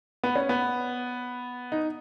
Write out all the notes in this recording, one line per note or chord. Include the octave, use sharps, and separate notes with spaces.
B3
C#4
B3
D#4